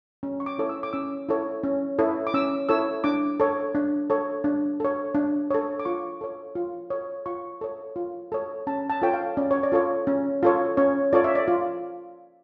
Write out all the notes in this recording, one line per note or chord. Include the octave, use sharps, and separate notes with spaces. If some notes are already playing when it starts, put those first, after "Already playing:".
C#4
C#6
D6
E4 A4 C#5
E6
D6
C#4 E6
E4 A4 C#5
C#4
E4 A4 C#5
D6
C#4 E6
E4 A4 C#5 E6
D4 D6
A4 C#5
D4
A4 C#5
D4
A4 C#5
D4
A4 C#5
D6
F4 C#6
A4 C#5
F4
A4 C#5
F4 C#6
A4 C#5
F4
A4 C#5
C#4 A5
A5
F4 A4 C#5 G5
F5
C#4 D5
C#5
D5
F4 A4 C#5
C#4
F4 A4 C#5
C#4 C#5
F4 A4 C#5 D5
E5
D5
F4